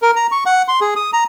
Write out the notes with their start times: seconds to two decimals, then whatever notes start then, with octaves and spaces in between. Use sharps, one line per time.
0.02 A#4
0.16 A#5
0.32 C#6
0.46 F#5
0.68 C6
0.81 G#4
0.96 D#6
1.13 A#5